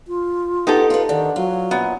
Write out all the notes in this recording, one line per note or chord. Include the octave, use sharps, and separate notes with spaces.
F4
B3 D#4 G4 A4
F4 B4
D3 D#3
F#3 F4
F#2 A#2 B3